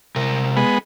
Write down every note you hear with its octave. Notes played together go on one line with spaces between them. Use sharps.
C3 A#4
G#3 B3